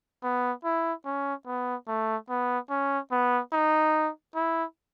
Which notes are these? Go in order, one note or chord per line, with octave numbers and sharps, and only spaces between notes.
B3
E4
C#4
B3
A3
B3
C#4
B3
D#4
E4